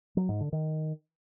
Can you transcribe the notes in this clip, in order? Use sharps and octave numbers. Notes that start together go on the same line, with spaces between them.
F#3
G#2
D3
D#3